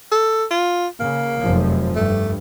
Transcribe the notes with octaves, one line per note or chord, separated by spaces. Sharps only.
A4
F4
C#3 A#3
F1 F#2 F3
G2 A3